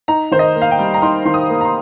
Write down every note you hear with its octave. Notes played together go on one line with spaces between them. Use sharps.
D#4 A#5
D#3 C5
D#5
A#3
F5
G5
G3
A#5
D#4 C6
D#3 C6
D#6
A#3
A#5
C6